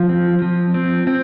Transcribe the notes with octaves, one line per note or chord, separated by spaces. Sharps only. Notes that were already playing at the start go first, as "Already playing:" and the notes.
Already playing: F3
C4
F3
C4
C4